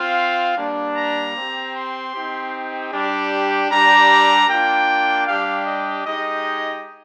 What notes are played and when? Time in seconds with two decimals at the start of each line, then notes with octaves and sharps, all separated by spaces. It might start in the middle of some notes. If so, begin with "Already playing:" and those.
Already playing: C4 F4 F5
0.56 G3 A#3 D4
0.96 A#5
1.35 C4 G4
1.74 C6
2.13 C4 D#4 G4
2.91 G3 D4 G4
3.70 G3 D4 G4 A#5
4.48 A#3 D4 F4 G5
5.26 G3 D4 G4 F5
5.66 D#5
6.05 G#3 D#4 G4 D#5